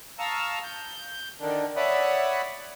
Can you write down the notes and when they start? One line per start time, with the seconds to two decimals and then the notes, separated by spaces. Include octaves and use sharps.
0.19 F5 A5 A#5 C#6 D#6 E6
0.64 G6
1.40 D3 D#3 D4
1.76 C#5 D5 E5 F#5 B5 D#6